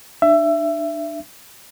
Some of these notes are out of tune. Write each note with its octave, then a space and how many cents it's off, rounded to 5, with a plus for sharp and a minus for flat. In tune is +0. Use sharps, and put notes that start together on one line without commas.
D4 +30 E5 +20